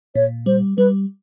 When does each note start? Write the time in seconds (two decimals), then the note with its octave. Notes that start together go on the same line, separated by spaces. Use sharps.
0.15 A#2 C#5
0.46 G3 C5
0.78 G3 B4